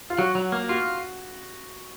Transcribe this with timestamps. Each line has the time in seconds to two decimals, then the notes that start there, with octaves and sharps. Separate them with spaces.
0.10 F4
0.18 F#3 F#4
0.35 F#3
0.52 A#3
0.69 F4 F#4